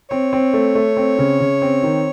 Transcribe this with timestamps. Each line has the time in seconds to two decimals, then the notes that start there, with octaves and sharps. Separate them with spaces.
0.10 C4 C#5
0.33 C4
0.54 A3
0.75 A3
0.97 C4
1.19 C#3
1.41 C#3
1.62 C4
1.83 D#3